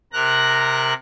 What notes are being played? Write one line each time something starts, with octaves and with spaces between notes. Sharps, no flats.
C3 A#4 A#5 F#6